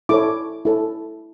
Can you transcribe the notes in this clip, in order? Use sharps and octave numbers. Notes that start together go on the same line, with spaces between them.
E4 A4 C#5 D6
E4 A4 C#5